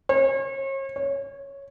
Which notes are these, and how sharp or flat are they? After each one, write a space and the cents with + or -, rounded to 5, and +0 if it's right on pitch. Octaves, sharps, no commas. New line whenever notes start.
C#5 -40
C#5 +0